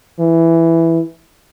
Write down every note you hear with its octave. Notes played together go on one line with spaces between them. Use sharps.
E3